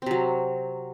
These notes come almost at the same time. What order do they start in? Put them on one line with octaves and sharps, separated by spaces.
C4 C3 F#3